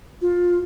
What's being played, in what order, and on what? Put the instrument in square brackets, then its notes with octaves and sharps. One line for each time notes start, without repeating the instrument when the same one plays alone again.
[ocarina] F4